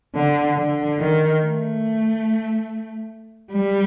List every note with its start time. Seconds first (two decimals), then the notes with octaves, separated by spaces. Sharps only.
0.15 D3
0.57 D3
0.99 D#3
1.42 A3
3.52 G3